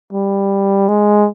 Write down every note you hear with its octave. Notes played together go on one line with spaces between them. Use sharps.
G3
G#3